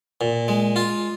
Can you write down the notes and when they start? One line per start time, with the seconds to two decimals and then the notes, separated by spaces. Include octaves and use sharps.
0.21 A#2
0.48 G#3
0.76 F4